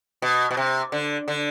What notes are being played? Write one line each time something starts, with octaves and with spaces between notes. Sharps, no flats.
B2
B2
C3
D3
D3